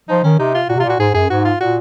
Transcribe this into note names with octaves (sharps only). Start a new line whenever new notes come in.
F3 D#4
D#3 C#4
C3 D#4
F4
A#2 F#4
C3
A#2 F4
F#4
G#2 G#4
F#2 G#4
G#2 F#4
F4
A#2 F#4